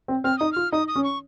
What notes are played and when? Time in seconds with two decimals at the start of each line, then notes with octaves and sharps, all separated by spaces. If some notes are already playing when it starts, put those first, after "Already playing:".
0.08 C4
0.24 C4 F6
0.38 D#4 D#6
0.52 F4 F6
0.72 D#4 D#6
0.88 D#6
0.96 C#4
1.04 C#6